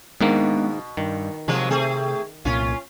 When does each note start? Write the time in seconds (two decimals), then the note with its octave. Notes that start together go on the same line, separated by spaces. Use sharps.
0.21 G#2 B2 D#3 G#3 A#3 B3 D4
0.97 G2 D#3
1.48 C3 F3 F#3 G#3
1.71 A3 C4 G#4
2.45 C2 A#2 C#4 F4